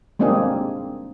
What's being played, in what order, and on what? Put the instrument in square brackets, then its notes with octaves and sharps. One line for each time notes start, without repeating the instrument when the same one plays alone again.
[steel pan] G3 G#3 A#3 C4 D4 G#4